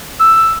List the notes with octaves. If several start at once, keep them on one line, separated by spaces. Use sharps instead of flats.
E6